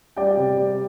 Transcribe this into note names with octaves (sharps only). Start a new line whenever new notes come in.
G3 D5 G5
C3
G3